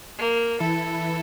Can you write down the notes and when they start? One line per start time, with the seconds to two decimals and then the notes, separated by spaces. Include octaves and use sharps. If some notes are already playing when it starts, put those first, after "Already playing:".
0.18 A#3
0.60 E3 E4 A4